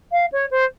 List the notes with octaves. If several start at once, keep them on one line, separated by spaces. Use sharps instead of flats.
F5
C#5
C5